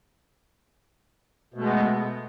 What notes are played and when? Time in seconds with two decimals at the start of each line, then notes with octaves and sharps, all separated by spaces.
1.54 B2
1.58 A3
1.61 G#3
1.64 B3